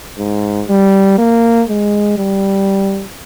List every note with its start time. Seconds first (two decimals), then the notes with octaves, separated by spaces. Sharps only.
0.18 G#2
0.69 G3
1.18 A#3
1.69 G#3
2.18 G3